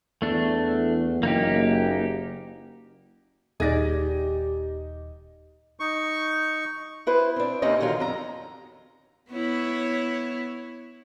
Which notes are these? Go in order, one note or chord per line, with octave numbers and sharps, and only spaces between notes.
E2 A3 D4
F#1 A#3 D#4 G4
D#1 D#4 G4 G#4 D5 A#6
D#4 C#6
E4 B4 C5
C4 D4
D#2 C3 D#3 C#4 D#5
D3 D#3 F#3 F4
F2 A#5
B3 E4 C#5